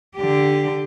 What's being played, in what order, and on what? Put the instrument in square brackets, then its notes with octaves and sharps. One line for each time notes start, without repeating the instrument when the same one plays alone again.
[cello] D3 G4